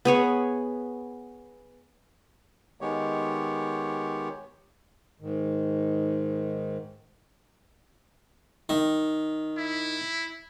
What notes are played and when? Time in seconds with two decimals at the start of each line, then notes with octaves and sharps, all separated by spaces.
0.05 B3 G#4 C#5
2.81 D#3 G#3 B3 G4 C#5
5.20 G#2 D#3
8.69 D#3
9.57 E4